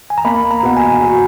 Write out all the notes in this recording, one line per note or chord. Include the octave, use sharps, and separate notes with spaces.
G#5
A#5
A#3 B5
A#5
B2 F#5
G#5
F#4